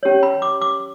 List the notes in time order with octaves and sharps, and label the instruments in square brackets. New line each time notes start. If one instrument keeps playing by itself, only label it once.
[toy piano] C#4 G4 C#5
B5
D6
D6